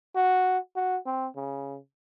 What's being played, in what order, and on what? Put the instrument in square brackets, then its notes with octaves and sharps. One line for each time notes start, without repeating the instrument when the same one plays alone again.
[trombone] F#4
F#4
C4
C#3